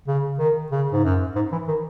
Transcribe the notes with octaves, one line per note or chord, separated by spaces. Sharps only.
C#3
D#3
C#3
G#2
F#2
G#2
E3
D#3